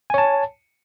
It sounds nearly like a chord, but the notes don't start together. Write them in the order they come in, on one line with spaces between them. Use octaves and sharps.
G#5 C#5 A5